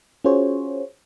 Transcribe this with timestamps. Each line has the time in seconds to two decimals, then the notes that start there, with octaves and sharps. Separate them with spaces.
0.24 C#4 F4 F#4 G#4 C5 C#5